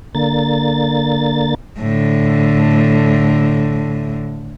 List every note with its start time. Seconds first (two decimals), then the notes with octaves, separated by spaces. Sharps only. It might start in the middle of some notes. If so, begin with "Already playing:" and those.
0.15 D3 A#3 A6
1.79 A2 D3